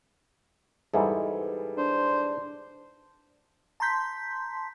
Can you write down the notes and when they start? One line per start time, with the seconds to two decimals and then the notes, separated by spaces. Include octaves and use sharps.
0.93 G#2 E3 G3 G#4 A4
1.78 D4 C5
3.80 A5 A#5 C6 G6 B6